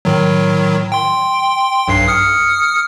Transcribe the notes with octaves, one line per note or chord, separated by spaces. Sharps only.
A2 D#3 F#3
G5 C6
B1 G2 C7
D#6 F6 C#7